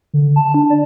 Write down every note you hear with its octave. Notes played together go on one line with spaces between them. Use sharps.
D3
A5
D4
D5